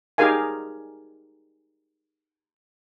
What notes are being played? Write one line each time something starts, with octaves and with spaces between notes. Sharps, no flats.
D#4 G4 G#4 A#4 F5 G#5